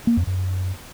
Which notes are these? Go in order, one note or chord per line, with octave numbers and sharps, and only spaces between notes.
A#3
F2
F#2